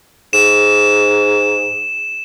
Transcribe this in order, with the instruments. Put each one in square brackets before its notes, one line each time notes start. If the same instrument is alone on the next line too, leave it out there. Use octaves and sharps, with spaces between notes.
[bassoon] G#2 [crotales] E7